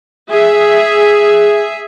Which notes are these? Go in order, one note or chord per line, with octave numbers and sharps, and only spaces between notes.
G#4 E5